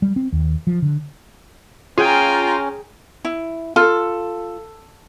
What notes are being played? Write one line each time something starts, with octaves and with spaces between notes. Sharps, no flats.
G3
C4
D#2
F3
D3
C#4 F4 G#4 G5 G#5 A#5
E4
F4 A4